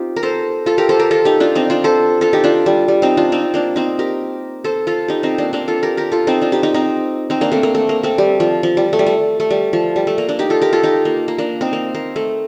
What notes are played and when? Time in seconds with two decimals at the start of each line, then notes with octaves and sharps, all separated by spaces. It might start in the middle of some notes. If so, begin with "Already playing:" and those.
Already playing: C4 D#4 F4 G4
0.16 A#4
0.23 A4 C5
0.66 F4 A4
0.78 G4 A#4
0.89 A4 C5
0.99 G4 A#4
1.11 F4 A4
1.25 D#4 G4
1.40 D4 F4
1.55 C4 D#4
1.70 D4 F4
1.84 A4 C5
2.21 F4 A4
2.33 D#4 G4
2.44 D4 F4
2.66 G3
2.88 G3
3.02 C4 D#4
3.17 D4 F4
3.32 C4 D#4
3.54 A#3 D4
3.76 C4 D#4
3.99 G4 A#4
4.64 A4 C5
4.87 F4 A4
5.08 D#4 G4
5.23 C4 D#4
5.38 A#3 D4
5.53 A#3 D4
5.68 F4 A4
5.83 G4 A#4
5.97 G4 A#4
6.12 F4 A4
6.27 C4 D#4
6.42 D4 F4
6.52 D#4 G4
6.63 D#4 G4
6.74 C4 D#4
7.30 C4 D#4
7.41 A#3 D4
7.52 A3 C4
7.63 A#3
7.75 A3
7.89 A#3
8.03 A3 C4
8.18 G3
8.40 F3
8.63 F3
8.77 G3
8.93 A3
8.99 G3
9.06 A3
9.40 A3
9.50 G3
9.73 F3
9.96 G3
10.07 A3
10.18 A#3
10.28 A#3 D4
10.39 D#4 G4
10.50 F4 A4
10.62 G4 A#4
10.73 F4 A4
10.83 D#4 G4
11.05 A#3
11.28 A#3
11.38 A#3 D4
11.61 C4 D#4
11.73 A#3
11.95 A#3
12.16 A3